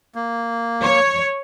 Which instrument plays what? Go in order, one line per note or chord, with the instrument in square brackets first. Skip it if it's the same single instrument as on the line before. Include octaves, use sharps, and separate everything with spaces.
[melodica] A#3
[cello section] C#5